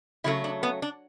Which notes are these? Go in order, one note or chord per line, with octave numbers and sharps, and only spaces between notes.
C#3 F#3 A3 E4
D4
B3
D4